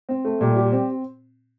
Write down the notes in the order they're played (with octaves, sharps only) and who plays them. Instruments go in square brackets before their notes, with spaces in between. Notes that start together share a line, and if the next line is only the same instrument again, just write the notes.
[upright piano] C4
A3
[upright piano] A#2 [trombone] G3
[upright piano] G4
C4